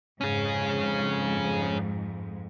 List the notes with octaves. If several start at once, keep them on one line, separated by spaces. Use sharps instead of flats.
F2 G#2 C#4 G#4